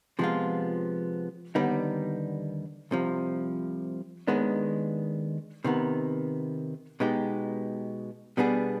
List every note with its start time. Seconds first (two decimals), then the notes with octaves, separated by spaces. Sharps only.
0.19 C3 F3 G#3 B3 F4
1.55 D#2 D3 G3 B3 D#4
2.91 C2 C3 F3
4.27 D#2 D#3 G#3 B3 D4
5.64 C3 D#3 B3
7.00 B2 G#3 B3 D#4 G4
8.37 B2 G3 B3 D4 G#4